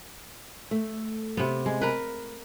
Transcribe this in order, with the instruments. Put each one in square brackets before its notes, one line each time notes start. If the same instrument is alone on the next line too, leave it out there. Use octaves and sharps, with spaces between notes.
[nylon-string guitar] A3
[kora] C3 B3
G#3
A#4 B4